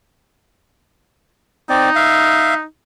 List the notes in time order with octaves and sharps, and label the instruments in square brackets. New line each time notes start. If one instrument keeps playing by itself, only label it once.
[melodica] C4 D5 [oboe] D#4
[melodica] E5 F5